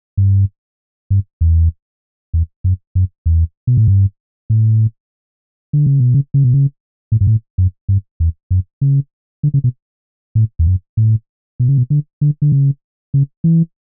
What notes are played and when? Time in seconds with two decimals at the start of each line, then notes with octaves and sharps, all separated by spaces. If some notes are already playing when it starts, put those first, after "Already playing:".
0.17 G2
1.10 G2
1.41 E2
2.34 E2
2.64 F#2
2.95 F#2
3.26 E2
3.67 B2
3.77 A2
3.88 G2
4.50 A2
5.73 D3
5.86 C#3
6.00 B2
6.14 C#3
6.34 C#3
6.44 B2
6.54 C#3
7.12 A2
7.21 G2
7.27 A2
7.58 F#2
7.89 G2
8.20 E2
8.51 F#2
8.81 C#3
9.43 D3
9.54 C#3
9.64 B2
10.35 A2
10.59 E2
10.67 F#2
10.97 A2
11.60 B2
11.69 C#3
11.78 B2
11.90 D3
12.21 D3
12.42 D3
12.52 C#3
13.14 C#3
13.44 E3